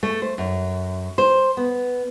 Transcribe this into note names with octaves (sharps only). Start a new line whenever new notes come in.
A3
C5
F#2
C5
B3